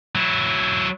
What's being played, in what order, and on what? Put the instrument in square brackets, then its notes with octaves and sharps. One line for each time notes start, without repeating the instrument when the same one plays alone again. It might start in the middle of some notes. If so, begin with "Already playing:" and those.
[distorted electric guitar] F#3 E4